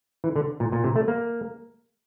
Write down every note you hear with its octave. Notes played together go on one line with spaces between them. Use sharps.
E3
D3
A#2
A#2
C3
A3
A#3